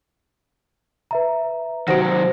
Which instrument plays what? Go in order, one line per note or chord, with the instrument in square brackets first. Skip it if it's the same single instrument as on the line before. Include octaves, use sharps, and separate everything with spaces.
[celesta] B4 E5 A#5
[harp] C3 [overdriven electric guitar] D#3 F#3 [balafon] F#4 C5 F#5 [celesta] A#6 D7